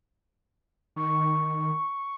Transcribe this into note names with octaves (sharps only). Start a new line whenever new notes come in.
D#3 C#6